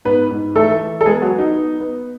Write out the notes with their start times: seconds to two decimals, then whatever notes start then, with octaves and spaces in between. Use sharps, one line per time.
0.05 G#2 B3 B4
0.31 G#2
0.55 E3 A3 A4
0.80 E3
1.01 A4
1.06 G#3 B3 G#4
1.22 F#3 F#4
1.30 B3
1.39 D#4
1.56 B3
1.80 B3